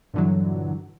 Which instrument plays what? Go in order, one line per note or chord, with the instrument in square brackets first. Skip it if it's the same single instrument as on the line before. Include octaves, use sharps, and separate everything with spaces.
[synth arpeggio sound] G2 A#2 D3 E3 F#3